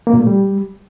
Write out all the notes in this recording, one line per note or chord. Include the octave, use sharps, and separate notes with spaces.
A#3
A#2
A3
G3